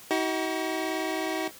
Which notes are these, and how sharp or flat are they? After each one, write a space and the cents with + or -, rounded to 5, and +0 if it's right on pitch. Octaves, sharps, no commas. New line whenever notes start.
D#4 +40 F#4 +35